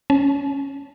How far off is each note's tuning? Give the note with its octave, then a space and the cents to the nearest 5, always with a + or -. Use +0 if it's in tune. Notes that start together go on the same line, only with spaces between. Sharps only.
C#4 +0 A5 -35